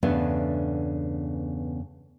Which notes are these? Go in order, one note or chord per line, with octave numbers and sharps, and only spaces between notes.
E2 G2 C#3 A3 B3 D4